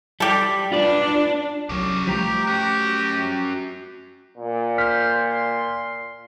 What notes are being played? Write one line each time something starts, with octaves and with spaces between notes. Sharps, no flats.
G3 G4 A4
D4 F4 B4 D5
C2 F#3 C#4 G4
F3 G3 A3 G4 B4 A#5
C#4 F#4 G4
A#2
C5 F6 B6
C6